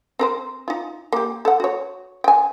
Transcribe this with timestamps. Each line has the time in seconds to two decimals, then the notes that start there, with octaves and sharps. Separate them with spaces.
0.19 C4 A#4 C5
0.68 D#4 F4
1.13 A#3 G4
1.45 A4 F#5
1.60 F#4 C#5
2.24 G5 G#5